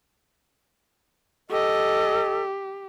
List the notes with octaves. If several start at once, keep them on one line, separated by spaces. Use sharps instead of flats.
G4 A4 D#5